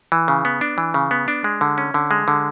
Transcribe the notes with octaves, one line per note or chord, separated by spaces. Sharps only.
E3
C#3
B3
D4
E3
C#3
B3
D4
G#3
D3
C#4
D3
G#3
D3